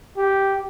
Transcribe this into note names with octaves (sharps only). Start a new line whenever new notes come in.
G4